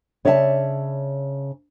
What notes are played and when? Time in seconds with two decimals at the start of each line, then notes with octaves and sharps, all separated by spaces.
0.25 C#3 C#5 D5 E5 G5 A5